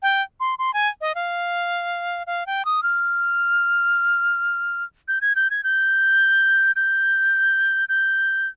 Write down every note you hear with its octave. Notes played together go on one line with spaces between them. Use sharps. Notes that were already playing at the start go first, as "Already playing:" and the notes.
G5
C6
C6
G#5
D#5
F5
F5
G5
D#6
F6
G6
G#6
G6
G#6
G6
G6
G6